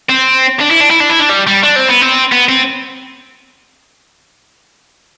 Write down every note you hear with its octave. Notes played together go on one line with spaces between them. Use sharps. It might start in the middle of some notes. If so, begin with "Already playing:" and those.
C4
D4
E4
D4
E4
D4
E4
D4
G3
G3
D4
C4
B3
C4
B3
C4